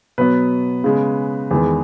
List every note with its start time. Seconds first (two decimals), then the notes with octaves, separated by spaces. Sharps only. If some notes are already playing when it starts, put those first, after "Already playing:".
0.18 B2 F#3 B3 B4
0.84 C#3 G#3 B3
1.51 E2 D#3 G#3 B3